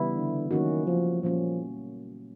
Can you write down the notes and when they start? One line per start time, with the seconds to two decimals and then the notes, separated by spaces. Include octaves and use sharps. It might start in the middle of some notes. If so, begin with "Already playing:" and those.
Already playing: C#3 E3 G3 B3 E4
0.15 D3
0.51 D#3 F#3 A#3 C#4 F#4
0.87 F3
1.23 A#2 F3 G3 A#3 C#4